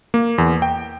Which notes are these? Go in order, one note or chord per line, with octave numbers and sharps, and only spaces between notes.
A#3
E2
G5